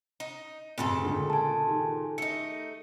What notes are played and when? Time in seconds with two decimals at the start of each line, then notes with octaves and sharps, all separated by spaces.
0.20 D#4
0.78 F1 F#2 A#2 C#3 A4
1.05 C#2 D3
1.30 G#5 A5
1.67 D#3 G4
2.18 A3 D#4 C#7